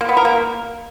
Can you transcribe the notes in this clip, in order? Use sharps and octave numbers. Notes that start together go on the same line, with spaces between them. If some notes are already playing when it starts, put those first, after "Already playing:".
A#3
B3
A#4
A#3